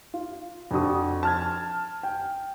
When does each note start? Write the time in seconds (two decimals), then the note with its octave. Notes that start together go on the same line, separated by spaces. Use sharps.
0.14 F4
0.71 F2 D4 F#4 D#6
1.23 A5 F6 G#6
2.03 G5